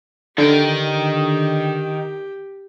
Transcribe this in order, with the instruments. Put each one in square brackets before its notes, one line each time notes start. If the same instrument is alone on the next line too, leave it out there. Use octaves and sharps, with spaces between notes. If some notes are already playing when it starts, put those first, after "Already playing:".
[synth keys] D3 [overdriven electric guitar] D#3 G5 [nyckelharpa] G4